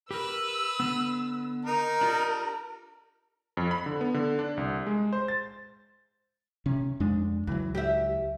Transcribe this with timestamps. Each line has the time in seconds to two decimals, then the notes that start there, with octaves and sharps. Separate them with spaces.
0.11 G4 A#4 B4 E6
0.80 D3 B3
1.65 D#4 A#4
2.01 D4 F4 G4
3.57 F2
3.71 B5
3.86 D3
4.01 B3
4.14 D3
4.39 D4
4.57 C2
4.87 G#3
5.13 C5
5.28 A6
6.66 C3 C#4
7.00 F2 G#3 D4
7.47 C#2 E3 F#3
7.75 G4 E5